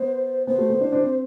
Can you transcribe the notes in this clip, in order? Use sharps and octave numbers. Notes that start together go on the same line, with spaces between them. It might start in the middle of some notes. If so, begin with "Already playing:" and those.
Already playing: B3 C5
B3 C5
A3
B3
D4
D4
C4